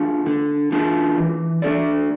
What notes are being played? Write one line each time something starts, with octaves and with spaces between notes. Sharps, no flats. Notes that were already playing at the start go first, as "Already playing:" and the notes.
Already playing: A3 D4 F4
D3
A3 D4 F4
E3
A3 D4 A4 D5